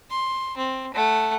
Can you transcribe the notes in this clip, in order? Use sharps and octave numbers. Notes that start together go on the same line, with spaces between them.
C6
C4
A3 F#5